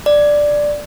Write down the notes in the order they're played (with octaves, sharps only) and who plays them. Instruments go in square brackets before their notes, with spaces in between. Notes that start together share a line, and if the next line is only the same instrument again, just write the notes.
[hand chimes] D5